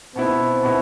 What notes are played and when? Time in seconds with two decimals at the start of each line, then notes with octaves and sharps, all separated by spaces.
0.16 B2 B3 C4 E4
0.63 B2 B3 E4